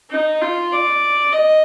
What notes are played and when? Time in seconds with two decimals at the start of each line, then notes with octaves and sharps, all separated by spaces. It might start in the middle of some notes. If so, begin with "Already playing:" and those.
0.10 D#4
0.41 F4
0.72 D5
1.33 D#5